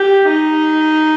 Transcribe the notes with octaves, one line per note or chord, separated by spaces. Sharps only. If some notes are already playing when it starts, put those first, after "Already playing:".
Already playing: G4
D#4